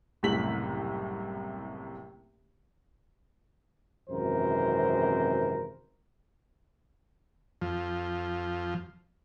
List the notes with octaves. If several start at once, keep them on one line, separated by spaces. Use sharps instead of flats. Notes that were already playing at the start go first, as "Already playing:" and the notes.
F#1 C2 A2 C3 B6 F#7
G#1 F#2 C3 E3 A#4 C5
F2 F3